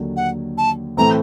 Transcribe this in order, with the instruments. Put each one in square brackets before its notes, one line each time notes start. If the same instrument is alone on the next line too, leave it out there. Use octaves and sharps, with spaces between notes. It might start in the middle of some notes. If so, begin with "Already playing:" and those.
Already playing: [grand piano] D#2 D3 F#3
[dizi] F#5
A5
[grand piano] A2 E3 A3 C4 [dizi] A#5